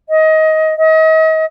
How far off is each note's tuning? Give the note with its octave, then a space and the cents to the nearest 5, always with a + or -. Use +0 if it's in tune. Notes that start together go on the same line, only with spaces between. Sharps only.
D#5 +20
D#5 +40